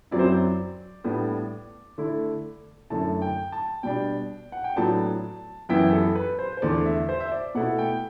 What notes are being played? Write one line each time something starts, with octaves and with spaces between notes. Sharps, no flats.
F#2 F#3 C4 E4 D5
C5
D5
A2 G3 B3 D4
D3 A3 E4
F#2 D3 A3 E4 A5
G5
A5
B2 G3 D4 G5
F#5
G5
A2 F#3 B3 D4 A5
F#2 E3 B3 E4 G5
A4
B4
C5
C5
E2 D3 A3 D5
E5
C5
E5
D5
B2 A3 E4 F#5
G5